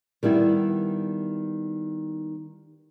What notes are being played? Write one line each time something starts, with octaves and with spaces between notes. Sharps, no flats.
D#3 G3 B3 E4